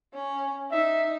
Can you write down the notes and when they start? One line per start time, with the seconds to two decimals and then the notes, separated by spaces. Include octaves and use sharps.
0.14 C#4
0.71 D#4 E5